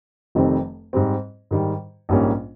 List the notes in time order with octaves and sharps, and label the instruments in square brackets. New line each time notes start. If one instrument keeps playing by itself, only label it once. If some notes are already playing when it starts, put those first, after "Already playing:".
[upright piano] F1 F2 D#3 G3 C4
G#2 G3 C4
G#2 D#3 G3
A#1 G#2 G3 A#3 C#4